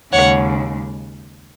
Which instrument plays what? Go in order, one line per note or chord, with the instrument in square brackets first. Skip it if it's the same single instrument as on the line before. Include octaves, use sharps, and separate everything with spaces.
[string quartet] D#2 C#3 G#3 C#5 F#5